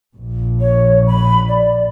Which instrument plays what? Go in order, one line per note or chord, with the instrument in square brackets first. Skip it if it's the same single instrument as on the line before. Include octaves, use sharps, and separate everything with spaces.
[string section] A#1
[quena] C#5
B5
D5